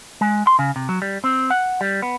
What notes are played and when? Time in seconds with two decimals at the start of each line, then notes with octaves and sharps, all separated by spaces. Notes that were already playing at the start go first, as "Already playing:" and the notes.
0.21 G#3
0.47 C6
0.59 C#3
0.76 C3
0.89 F#3
1.02 G3
1.24 C4
1.50 F#5
1.81 G3
2.02 B3